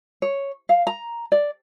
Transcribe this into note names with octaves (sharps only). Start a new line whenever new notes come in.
C#5
F5
A#5
D5